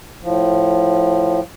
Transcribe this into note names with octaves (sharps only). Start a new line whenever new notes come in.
A2 F3